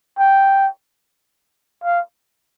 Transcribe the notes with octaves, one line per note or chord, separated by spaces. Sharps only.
G5
F5